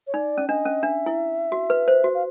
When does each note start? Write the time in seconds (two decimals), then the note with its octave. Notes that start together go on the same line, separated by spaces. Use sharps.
0.07 C#5
0.14 D#4 D5
0.38 C#4
0.49 D4 D#5
0.65 C#4
0.83 D4 E5
1.06 E4
1.52 F#4
1.70 B4
1.88 C5
2.04 F#4
2.14 F5